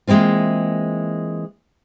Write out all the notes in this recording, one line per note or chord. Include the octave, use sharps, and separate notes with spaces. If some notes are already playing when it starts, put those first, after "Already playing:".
E3 G#3 A#3 C4 F4